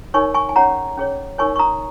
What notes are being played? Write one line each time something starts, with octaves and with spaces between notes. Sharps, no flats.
D#4 A#4 C#5 G#5 C#6
G#5 C#6
G#5
C#4 G#4 C#5 F#5 A#5
C#4 G#4 C#5
D#4 A#4 C#5 G#5 C#6
C#6
A#5 D#6